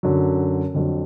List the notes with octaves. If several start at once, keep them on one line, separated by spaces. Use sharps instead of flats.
F#2 D3 F#3
F2 D3 F#3